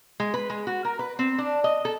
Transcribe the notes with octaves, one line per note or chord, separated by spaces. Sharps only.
G#3
B4
G#3
F#4
A#4
B4
C4
D4
D#5
A4